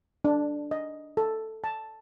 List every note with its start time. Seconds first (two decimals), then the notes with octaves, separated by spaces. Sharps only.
0.25 D4
0.71 D#5
1.17 A4
1.64 A5